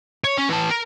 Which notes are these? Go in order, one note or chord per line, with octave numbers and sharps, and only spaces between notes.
C#5
C#4
E3 A5
A#4